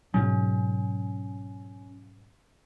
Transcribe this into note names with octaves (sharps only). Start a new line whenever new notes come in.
G#2 B2 F#3 C#4